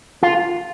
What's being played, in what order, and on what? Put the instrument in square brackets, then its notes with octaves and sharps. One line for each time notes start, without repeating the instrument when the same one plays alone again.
[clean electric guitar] F4